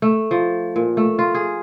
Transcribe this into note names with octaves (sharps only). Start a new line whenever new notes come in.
A3
F3
A#2
A3
F4
G#4